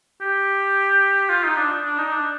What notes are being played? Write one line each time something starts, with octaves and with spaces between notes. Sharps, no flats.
G4
F4
D#4
D4
D4
D#4
D4